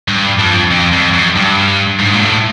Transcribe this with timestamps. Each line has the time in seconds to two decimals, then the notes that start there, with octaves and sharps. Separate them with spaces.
0.08 G2
0.39 F2
0.71 F2
0.93 F2
1.14 F#2
1.36 G2
1.99 G#2
2.14 A#2
2.21 A2